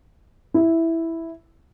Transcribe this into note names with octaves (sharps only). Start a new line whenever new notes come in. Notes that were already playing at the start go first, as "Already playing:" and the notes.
E4